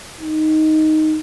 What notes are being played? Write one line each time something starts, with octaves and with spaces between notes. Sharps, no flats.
D#4